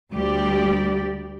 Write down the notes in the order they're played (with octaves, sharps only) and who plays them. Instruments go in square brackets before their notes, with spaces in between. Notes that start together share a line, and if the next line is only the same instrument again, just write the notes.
[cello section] D2 G3 G4 D5